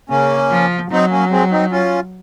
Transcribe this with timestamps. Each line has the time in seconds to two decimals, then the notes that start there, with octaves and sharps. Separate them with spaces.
0.10 C#3 A#3 C#4
0.51 F3
0.91 F#3 C4 D#4
1.10 A#3 C#4
1.31 G#3 C4
1.51 C4 D#4
1.71 C#4 F4